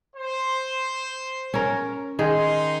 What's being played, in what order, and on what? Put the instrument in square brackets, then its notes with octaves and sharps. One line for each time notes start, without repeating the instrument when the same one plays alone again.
[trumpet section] C5
[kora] C#4 A#4
[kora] D#3 G#4 [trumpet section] D#4 C6